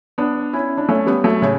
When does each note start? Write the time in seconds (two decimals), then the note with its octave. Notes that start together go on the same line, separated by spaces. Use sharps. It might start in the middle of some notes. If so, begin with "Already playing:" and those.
0.18 B3 D4
0.53 C#4 E4
0.78 D4
0.89 A3 C#4
1.07 G3 B3
1.24 F#3 A3
1.42 A2 C#3